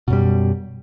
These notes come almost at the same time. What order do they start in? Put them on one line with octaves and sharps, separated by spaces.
B2 F#2 G3